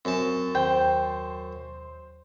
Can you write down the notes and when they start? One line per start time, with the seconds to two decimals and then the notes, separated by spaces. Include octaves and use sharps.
0.05 F#2 C4 A5
0.55 D#2 C5 G5